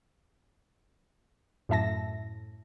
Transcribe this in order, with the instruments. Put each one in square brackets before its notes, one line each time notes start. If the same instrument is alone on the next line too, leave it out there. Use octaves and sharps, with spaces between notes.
[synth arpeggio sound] F#2 A2 E5 A5 A#6